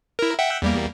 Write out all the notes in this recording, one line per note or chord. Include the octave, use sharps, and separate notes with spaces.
E4 A#4
E5 F#5 G5
E2 G3 A#3